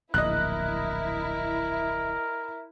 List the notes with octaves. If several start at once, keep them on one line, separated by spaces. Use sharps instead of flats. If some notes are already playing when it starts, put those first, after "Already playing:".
D1 A#1 E4 A#4 D#5 F#6